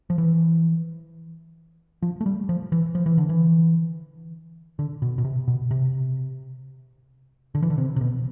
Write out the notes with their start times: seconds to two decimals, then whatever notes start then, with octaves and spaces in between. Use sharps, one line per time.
0.10 F3
0.18 E3
2.02 F3
2.21 A3
2.26 G3
2.49 F3
2.72 E3
2.95 F3
3.06 E3
3.18 D3
3.29 E3
4.79 D3
5.02 B2
5.18 B2
5.24 C3
5.48 B2
5.71 C3
7.55 D3
7.63 E3
7.70 D3
7.78 C3
7.96 C3
8.01 B2